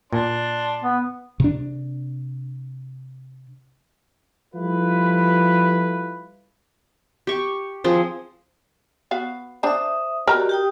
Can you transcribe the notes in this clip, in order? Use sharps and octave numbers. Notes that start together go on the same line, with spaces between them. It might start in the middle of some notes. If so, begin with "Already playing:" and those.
A#2 D4 C6
B3
C3 D4
F3 G3 E4 F4 A4 B4
G4 C#6
F3 C4 G#4
B3 F#4 F5
D4 C5 E5 D#6
F#4 G4 A#4 D5 D#5 A#5
G4 G5 D#6